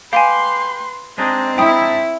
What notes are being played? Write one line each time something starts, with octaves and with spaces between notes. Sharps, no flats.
G4 B4 F5 G#5 C6
G#3 C4 D4 D#4
E4 G5 D#6